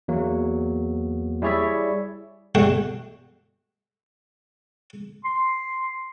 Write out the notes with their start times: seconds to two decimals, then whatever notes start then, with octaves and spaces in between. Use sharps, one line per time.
0.08 E2 F#3 A#3
1.42 G3 E4 G#4 C#5 D5 E5
2.55 E2 G2 B2 A3 G5
5.24 C6